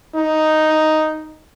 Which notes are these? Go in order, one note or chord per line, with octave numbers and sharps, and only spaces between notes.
D#4